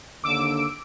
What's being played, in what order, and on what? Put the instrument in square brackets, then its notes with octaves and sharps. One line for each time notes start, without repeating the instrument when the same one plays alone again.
[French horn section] D#2 D3 [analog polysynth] D6 E6 D7